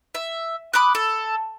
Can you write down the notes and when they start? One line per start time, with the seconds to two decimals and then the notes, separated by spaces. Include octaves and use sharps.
0.15 E5
0.74 B5 D6 D#6 F#6
0.95 A4